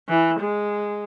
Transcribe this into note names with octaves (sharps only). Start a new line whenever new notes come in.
E3
G#3